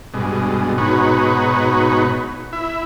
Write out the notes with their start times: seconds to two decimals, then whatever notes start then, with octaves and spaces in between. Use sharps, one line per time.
0.14 G2 B2 G#3
0.78 G#2 B2 D#4 F#4 B4 C#5
2.53 E4 E5